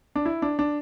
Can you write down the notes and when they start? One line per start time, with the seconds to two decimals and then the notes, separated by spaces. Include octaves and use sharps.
0.16 D4
0.26 E4
0.42 D4
0.59 D4